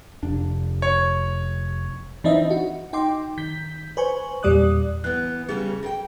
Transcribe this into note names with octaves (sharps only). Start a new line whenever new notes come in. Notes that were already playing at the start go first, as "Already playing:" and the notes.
F1 D4
C#5
E3 C4 D4 D#4 D#5 E5
F#4
D#4 G5 C6 D6
D#3 G6 B6
B4 C5 G#5 C#6
E2 A#2 G3 D5 D#6 F#6
E3 B3 F#6
C#3 G3 C#4 G#4
A#4 G5